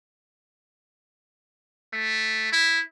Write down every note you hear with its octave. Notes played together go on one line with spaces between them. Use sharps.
A3
E4